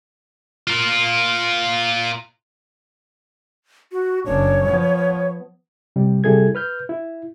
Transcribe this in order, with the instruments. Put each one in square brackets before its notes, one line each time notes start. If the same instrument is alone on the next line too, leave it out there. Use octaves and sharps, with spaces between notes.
[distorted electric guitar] F4 A#4
[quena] F#4
[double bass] F#1 D4 [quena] C#5
[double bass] F3 B3
[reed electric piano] C3 G3
C3 G3 E4 G#4 A4 G#6
B4 F6 G6
E4